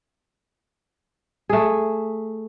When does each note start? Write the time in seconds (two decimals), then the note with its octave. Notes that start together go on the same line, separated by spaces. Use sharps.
1.49 A3 G#4